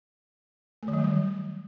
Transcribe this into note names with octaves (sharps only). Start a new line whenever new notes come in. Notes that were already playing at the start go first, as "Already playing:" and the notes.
A3
D#3
F#3
G3
D#3